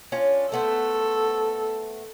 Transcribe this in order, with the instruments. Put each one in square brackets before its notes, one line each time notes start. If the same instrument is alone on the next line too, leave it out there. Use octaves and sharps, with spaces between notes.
[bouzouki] C#4 D4 F4
[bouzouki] A3 B3 C5 [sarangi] A4